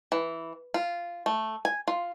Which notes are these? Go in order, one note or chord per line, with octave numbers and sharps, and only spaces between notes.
E3
F4
A3
G#5
F4